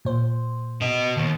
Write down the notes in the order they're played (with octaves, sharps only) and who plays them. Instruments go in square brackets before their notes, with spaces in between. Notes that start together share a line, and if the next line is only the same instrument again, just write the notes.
[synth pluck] A#2 C5
[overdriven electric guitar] B2 D#5
D#2